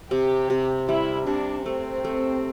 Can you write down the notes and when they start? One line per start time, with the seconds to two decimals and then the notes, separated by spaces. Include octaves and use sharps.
0.11 C3 G4
0.50 C3
0.89 G3 E4
1.27 C3 D4
1.66 A3 C4
2.04 A3